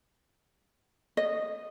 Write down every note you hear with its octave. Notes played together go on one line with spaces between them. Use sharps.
D#5